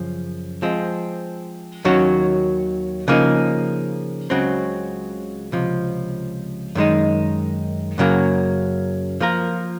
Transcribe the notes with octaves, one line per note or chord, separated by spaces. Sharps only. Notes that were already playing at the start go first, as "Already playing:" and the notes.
Already playing: F#2 C#3 F3
F3 G#3 C4
D#2 D#3 F#3 C#4 F#4
C#3 F3 A#3 D#4
C#2 C#3 F#3 C4 F#4
C#2 C3 F3
F#2 D#3 G#3 D#4
F#2 C#3 F#3 A#3
F3 A#3 F4 A#4